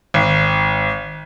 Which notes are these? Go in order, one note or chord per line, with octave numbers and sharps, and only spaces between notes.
G#1